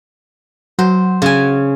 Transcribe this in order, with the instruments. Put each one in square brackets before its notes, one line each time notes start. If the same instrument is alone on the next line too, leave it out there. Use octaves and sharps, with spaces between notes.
[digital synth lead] F#3 [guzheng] C5
[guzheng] C#3 G#5